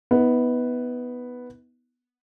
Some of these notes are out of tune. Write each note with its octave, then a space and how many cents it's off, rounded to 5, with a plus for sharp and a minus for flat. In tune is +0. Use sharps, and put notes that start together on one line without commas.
B3 +0 D#4 +45